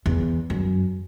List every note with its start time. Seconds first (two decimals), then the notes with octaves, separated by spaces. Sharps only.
0.06 E2
0.50 F#2